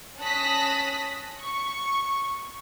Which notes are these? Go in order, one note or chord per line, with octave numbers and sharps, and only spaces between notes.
C#4 A5 D#6 F#6 A#6 B6
C#6